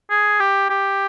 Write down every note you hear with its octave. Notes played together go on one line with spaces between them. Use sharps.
G#4
G4
G4